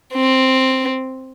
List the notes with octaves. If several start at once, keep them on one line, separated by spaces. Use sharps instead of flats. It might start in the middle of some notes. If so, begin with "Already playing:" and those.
C4